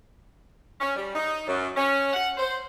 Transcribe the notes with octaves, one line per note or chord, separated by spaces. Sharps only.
C#4
G3
D#4
F#2
C#4
F#5
C5